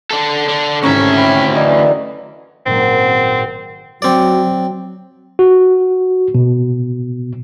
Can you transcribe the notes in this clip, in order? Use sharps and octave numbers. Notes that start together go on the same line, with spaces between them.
D4 A4
D3 D4
G#1 D2 A2 C3 C#4 E5 A#5 C#6
G5 B5 F6
F#2 D3 E3 D5 D#5 A#5
G#1 A#2 F#3 C4
F#3 C4 D5
F#4
B2